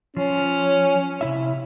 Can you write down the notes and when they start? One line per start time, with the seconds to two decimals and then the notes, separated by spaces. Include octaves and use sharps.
0.17 F3 C#4
1.21 C3 E4 E5